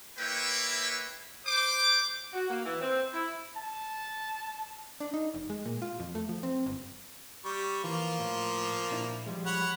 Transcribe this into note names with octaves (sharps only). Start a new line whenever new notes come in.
A#3 E4 B4 C#5 E5 G5
C5 D6
F#4
A#3
E3
C4
E4
A5
D4
D#4
F1
G#3
A#2
F4
F2
A3
F3
C4
G1
G3 C#6
E3 F3 A#3 F4
A2
A#2 D4 E4
F3 G3 G#3
C#5 F#5 B5